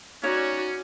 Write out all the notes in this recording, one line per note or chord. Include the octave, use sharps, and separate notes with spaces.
C#4 D#4 F#4 C#5 D5